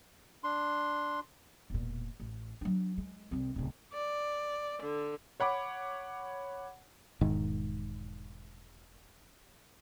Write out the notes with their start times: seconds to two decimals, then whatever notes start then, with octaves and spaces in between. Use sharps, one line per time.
0.44 D4 C6
1.70 E1 A#2
2.20 A1
2.61 F#3 D4
2.98 G#3
3.31 C2 C4
3.56 D1 C#3
3.92 D5
4.81 D3
5.40 C#5 F#5 B5 D6
7.21 E1 G#2 D#3